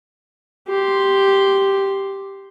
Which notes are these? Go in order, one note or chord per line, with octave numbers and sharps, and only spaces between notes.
G4 C6